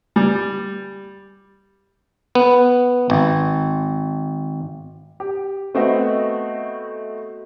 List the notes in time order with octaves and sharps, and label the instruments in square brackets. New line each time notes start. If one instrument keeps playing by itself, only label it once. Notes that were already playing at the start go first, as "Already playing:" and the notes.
[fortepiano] G3
[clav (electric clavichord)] B3
G#1
[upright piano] G4
A3 B3 C4 F#4 D#5 E5